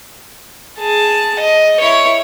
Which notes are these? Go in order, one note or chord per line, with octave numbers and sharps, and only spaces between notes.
G#4 A5
D#5
E4 C#5